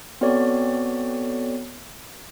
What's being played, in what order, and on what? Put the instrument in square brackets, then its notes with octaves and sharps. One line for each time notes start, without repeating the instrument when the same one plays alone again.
[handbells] B3 C4 F#4 A4 C#5 D5